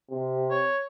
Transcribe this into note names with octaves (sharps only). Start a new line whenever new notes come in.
C3
C#5